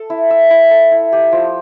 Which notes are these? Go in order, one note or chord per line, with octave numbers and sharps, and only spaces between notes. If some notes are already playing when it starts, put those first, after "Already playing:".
Already playing: A4
E4
E5
E4
A4
E4
G4
F3